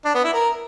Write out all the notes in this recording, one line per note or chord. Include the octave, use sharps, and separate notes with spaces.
D4
B3
E4
A#4